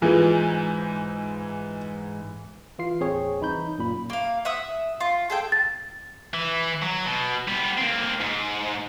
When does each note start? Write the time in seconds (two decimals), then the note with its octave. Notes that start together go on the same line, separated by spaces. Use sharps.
0.02 G#2 E3 F4 G#4
2.79 E3 F4 C7
3.00 A1 D#2 C4 G#4 C#5
3.40 C2 E3 D#4 B5 G6
3.78 F#2 A#2 B5
4.10 A#3 F5
4.45 E5 F#5 D#6 E6
5.00 F4
5.30 G#4 A4 G5
5.52 A6
6.34 E3
6.82 F#3
7.05 B2
7.48 G3 B3
7.77 A#3 C4
8.20 G#2